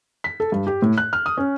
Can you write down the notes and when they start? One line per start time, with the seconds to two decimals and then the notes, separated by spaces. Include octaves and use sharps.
0.24 B6
0.40 A4
0.52 G2
0.67 G4
0.82 A2
0.98 F#6
1.13 F6
1.26 D#6
1.37 C#4